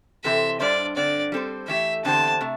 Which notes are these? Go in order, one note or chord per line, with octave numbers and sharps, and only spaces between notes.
C3 E3 C4 A4 C5 E5
G2 G3 D4 C5 D5
G2 D3 C4 D5
G3 C4 A4 C5
E3 A3 E4 G4 E5
E2 D3 C4 G4 C5 A5
C3 A3